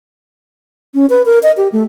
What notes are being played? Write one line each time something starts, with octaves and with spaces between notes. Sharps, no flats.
C#4
B4
A#4
D#5
G4
A3